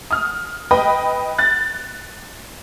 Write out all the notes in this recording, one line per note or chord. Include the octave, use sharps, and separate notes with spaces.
D#6 F6
B4 D#5 G5 B5
F#6 A6